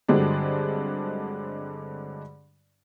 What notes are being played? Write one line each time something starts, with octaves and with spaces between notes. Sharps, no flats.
G2 D3 F#3 G#3 C4 D4